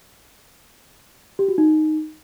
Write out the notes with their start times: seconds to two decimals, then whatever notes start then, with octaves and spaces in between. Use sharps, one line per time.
1.39 G4
1.49 F#4
1.58 D#4